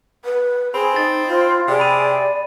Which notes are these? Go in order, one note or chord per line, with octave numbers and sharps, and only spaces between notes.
B4
C4 G#4 B5
D#4 A6
F4 C5
C3 G#4 D5 G5
B5 D#7